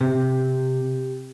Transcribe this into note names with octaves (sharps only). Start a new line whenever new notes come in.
C3 G4